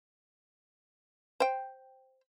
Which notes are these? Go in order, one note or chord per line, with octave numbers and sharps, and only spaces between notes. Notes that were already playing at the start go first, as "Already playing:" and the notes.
C5 G5